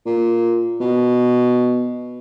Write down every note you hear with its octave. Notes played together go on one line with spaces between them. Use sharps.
A#2
B2